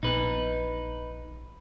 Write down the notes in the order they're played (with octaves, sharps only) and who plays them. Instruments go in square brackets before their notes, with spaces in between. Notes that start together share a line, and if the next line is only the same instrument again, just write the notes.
[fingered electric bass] A#1 B3 [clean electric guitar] D#4 B4